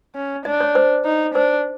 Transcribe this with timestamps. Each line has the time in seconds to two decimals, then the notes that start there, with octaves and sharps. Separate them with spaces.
0.15 C#4
0.45 D4 D#5
0.60 C#5
0.75 C5
1.05 D#4
1.35 D4 C5